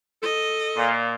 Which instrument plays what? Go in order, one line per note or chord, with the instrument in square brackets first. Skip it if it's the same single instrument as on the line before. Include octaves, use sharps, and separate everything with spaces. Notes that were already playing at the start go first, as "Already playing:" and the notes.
[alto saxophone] A4 [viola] D#5
[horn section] A#2